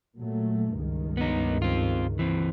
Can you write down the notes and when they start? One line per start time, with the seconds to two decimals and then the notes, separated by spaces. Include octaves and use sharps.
0.17 A#2 F#3 A3
0.76 C#2 G2 D#3
1.17 B3 D#4
1.62 C4 F4
2.19 E3 C4